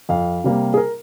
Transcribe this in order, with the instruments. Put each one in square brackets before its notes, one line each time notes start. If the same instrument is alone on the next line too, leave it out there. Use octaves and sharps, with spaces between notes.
[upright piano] F2 F5
C3 G3 A#3
G#4
A#4